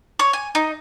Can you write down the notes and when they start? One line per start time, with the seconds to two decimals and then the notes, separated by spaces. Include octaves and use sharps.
0.19 C#5
0.33 G#5
0.55 D#4